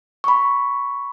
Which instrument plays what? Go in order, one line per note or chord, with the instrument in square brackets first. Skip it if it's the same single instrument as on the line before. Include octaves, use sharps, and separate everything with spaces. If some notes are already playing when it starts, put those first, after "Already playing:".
[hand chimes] B5 C#6